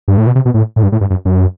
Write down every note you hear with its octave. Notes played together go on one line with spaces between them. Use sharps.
G2
A2
B2
C3
B2
A2
A2
G2
A2
G2
F#2
F#2